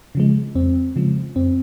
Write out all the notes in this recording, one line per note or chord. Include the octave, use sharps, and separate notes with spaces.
C#3 F3 G#3
F2 C4
C#3 F3 G#3
F2 C4